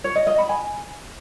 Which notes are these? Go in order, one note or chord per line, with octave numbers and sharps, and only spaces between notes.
C#5
D#5
D#5
B5
G#5